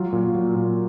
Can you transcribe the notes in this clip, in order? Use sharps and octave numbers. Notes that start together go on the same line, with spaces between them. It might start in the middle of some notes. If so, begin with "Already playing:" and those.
Already playing: F#3 F4
A#2
F#3
A#2